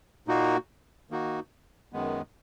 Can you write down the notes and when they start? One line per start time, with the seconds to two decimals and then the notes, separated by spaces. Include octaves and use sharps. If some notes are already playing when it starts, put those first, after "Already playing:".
0.28 A#2 A#3 D#4 F#4
1.11 D#3 A#3 D#4 F#4
1.93 F#2 D#3 G#3 B3